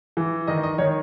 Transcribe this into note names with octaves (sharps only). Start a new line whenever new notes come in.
E3
D#3 D#5
D#5
D#3 C#5